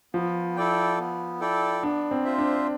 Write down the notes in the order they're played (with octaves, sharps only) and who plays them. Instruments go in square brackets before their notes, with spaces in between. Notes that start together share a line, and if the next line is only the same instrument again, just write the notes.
[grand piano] F3 [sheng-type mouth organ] B3
[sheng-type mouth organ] E4 A4 D5 G5
B3
E4 A4 D5 G5
[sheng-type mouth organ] B3 [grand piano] D4
[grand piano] C4
[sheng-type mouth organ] F4 C5 E5
[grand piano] D4